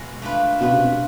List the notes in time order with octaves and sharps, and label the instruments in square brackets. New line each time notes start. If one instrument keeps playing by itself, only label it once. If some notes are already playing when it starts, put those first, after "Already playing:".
Already playing: [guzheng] B2 G#3
A3 D4 F4 B4
[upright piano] B2 [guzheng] A3 D4 F4 B4
[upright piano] C3
B2